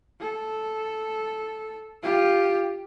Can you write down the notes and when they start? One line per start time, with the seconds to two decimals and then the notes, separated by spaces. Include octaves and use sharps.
0.20 A4
2.02 F4 G4